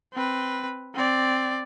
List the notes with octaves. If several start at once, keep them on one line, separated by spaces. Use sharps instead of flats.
C4 B4
C4 D5